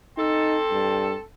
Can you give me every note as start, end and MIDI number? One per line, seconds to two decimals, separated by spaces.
0.18 1.22 60
0.18 0.58 63
0.18 1.22 69
0.71 1.14 43